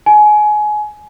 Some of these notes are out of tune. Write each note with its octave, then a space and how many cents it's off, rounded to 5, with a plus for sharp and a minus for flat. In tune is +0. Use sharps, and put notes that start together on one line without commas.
G#5 +25